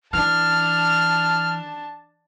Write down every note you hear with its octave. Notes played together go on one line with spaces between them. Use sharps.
E3 D4 A5 F6